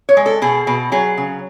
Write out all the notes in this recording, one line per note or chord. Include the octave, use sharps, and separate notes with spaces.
C#5
G#3
A4
B2 G#4
B2
F#3 G#4
C#3